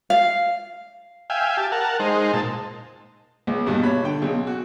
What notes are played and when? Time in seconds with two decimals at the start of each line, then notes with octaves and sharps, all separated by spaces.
0.10 F5
1.30 E5 F5 G5 G#5
1.57 G4 A5
1.72 A#4 F#5 A5
2.00 G#3 D#4 C5
2.33 A#2 A5
3.47 C#2
3.66 A#1 E2 G2 B2
3.83 B2 C#5 B5
4.03 D3 G5
4.22 B1 C#3
4.47 F#4